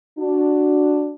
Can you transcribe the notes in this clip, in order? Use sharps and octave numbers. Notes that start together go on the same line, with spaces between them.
D4 F#4